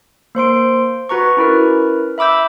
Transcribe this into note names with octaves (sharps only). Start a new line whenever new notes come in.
A#3 C5 C6 D7
F#4 B4 A#5 C#6
C#4 E4 A#4 B4
E5 B5 D6 E6 G6